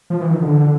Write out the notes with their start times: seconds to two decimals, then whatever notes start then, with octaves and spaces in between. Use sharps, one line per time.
0.10 F3
0.21 E3
0.31 D#3
0.42 D3